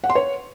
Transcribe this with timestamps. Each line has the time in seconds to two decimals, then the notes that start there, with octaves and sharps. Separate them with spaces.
0.04 F#5
0.10 C6
0.15 C#5